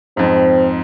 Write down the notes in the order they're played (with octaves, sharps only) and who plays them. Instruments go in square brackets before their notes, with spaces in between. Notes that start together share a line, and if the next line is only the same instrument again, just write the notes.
[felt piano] F2 G#2 [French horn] C4